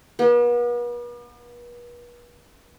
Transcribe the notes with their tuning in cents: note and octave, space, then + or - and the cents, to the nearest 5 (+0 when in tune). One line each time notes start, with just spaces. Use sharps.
B3 -40